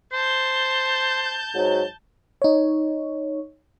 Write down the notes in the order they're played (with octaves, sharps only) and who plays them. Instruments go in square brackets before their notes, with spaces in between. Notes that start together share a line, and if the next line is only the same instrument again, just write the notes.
[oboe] C5 [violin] A5 G6
[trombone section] G#2 F#3
[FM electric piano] D#4 C#5